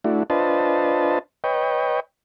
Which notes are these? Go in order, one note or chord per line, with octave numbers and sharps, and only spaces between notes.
A3 D4 E4 F#4
D4 F4 B4 C5 D#5 A5
B4 C#5 D#5 G5